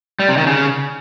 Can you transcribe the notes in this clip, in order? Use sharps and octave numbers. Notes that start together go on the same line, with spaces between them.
G3
C3
D#3
C#3